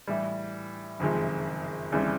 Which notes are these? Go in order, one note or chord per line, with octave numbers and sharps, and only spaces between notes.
A2 E3 G3
F#1 F2 C3 D#3 G#3
D#2 C#3 E3 G3 C4